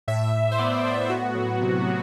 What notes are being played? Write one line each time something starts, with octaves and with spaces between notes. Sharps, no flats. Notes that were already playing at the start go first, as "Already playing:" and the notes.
A2 E5
A2
C5
B3 D5
A2 C5
B3 F#4
F#3
C3
F#3